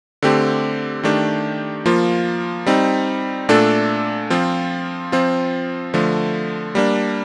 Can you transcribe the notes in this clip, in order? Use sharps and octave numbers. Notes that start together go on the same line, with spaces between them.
D3 A3 C4 G4
D#3 A3 D4 G4
F3 A#3 F4
G3 C4 D#4
A#2 A3 D4 A4
F3 C4 F4
F3 C4 F4
D3 F3 A3
G3 A#3 D4